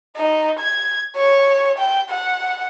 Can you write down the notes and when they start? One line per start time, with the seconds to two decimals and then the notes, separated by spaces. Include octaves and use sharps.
0.16 D#4
0.59 G#6
1.16 C#5
1.78 G5
2.10 F#5